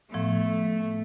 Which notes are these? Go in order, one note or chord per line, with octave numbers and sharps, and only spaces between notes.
A2 F3 A3 B3